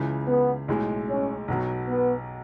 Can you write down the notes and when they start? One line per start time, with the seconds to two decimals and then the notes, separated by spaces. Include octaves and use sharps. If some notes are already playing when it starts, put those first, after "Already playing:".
Already playing: C#2 C#3 E3
0.28 B3
0.68 B1 A2 G#3
1.08 C#4
1.48 B1 B2 F#3
1.88 B3